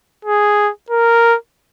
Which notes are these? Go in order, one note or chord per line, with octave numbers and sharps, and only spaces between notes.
G#4
A#4